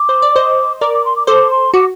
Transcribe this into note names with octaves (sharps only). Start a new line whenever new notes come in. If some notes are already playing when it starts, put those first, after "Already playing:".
Already playing: D6
C5
D5
C5 D#5
A#4 D5 D6
D6
C6
D6
A4 C5 D6
C6
F#4 D6